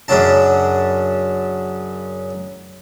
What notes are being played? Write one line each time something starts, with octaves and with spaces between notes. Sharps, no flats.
F#2 C#3 F#3 D4 A5